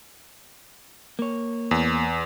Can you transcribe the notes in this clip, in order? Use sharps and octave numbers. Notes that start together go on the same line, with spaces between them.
A#3 C#5
E2